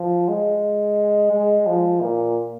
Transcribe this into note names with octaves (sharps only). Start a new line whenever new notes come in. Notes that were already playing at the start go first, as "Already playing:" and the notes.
Already playing: F3
G#3
G#3
F3
A#2